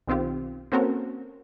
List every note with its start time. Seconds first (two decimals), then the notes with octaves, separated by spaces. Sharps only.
0.08 B1 D#3 C4 F4 G4
0.72 A#3 C4 C#4 F#4 A4 A#4